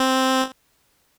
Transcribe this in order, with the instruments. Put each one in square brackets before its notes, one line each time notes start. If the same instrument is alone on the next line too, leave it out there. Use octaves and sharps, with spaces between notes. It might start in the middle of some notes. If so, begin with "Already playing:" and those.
Already playing: [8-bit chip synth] C4